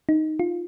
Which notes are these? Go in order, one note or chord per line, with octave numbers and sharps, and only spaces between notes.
D#4
F4